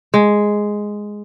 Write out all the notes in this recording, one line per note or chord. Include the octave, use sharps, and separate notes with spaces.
G#3